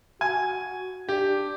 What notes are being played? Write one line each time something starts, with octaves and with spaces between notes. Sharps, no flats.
F#4 G#5
D4 G4